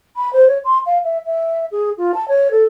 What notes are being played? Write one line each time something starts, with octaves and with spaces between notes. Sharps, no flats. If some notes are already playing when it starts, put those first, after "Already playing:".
B5
C5
C#5
C6
F5
E5
E5
G#4
F4
A5
C#5
A4